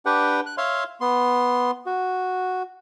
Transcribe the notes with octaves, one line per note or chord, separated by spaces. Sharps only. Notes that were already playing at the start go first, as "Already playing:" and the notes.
D4 G4 B4 F#5 G5
F#6
C#5 E5 F5 C6
B3 C6
F#4